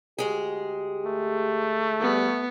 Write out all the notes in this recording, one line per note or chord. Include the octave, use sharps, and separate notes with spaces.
D2 G#3 G4 G#4
A3
G3 B3